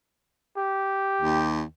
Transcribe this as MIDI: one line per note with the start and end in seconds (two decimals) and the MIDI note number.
0.57 1.56 67
1.21 1.63 39